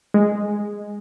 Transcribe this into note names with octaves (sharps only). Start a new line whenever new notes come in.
G#3